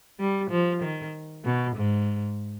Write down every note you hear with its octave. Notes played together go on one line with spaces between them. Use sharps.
G3
F3
D#3
B2
G#2